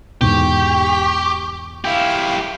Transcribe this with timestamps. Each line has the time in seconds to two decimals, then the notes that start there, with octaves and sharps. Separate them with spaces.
0.21 E2 G#2 B2 G4 C#6
1.85 E4 G4 F5